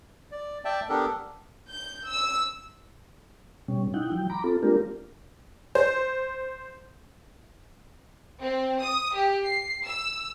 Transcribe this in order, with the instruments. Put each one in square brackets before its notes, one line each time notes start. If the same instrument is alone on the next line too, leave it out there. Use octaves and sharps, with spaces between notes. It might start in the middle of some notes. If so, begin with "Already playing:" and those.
[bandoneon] D5
D5 E5 G5 A5
B3 D4 G4 A4 A#4
[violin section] G6
E6
[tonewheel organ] B2 G3 C#4
D#4 E4 F#5 G5
F3 F#3 G5
A#5 B5 D6
C4 F4 A4
G#3 A#3 D4 F4 G4 A#4
[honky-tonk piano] C5
[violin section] C4
D#6
G4
C7
E6